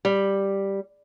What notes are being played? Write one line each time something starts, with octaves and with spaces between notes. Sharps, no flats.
G3